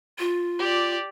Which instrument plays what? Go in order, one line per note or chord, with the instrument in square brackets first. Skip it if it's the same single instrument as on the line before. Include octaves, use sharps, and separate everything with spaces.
[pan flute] F4
[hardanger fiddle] G4 D5